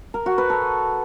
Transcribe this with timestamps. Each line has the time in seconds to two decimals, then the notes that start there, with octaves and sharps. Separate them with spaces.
0.14 A#4
0.26 F#4
0.38 B4
0.50 A4